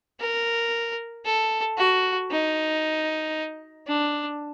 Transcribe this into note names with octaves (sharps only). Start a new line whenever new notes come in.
A#4
A4
F#4
D#4
D4